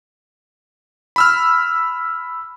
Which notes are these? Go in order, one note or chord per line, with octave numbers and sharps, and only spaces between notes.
B5 E6 F6